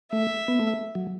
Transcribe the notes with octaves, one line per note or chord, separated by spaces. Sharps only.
A3 E5
B3
A3
F#3